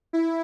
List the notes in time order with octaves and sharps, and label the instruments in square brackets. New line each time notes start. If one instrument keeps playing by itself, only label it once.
[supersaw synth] E4